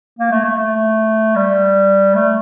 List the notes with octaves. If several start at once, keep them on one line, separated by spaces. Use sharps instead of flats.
A#3
A3
A3
A3
G3
A3